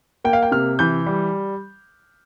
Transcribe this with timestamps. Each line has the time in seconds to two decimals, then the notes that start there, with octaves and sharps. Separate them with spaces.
0.24 A#3 G5
0.33 F5
0.43 G5
0.52 C3 F6
0.79 E3 G6
1.06 G3